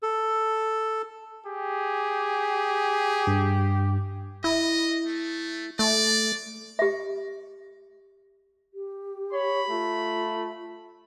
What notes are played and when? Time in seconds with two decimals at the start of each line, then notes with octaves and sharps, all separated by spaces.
0.03 A4
1.46 G4 G#4
3.27 G2
4.44 E4 D#5
5.06 A3
5.79 A3 D5
6.79 G4 E5
8.74 G4
9.33 C#5 B5
9.70 A3 F4